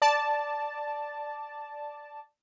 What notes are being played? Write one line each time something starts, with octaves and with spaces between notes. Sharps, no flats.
D5 A5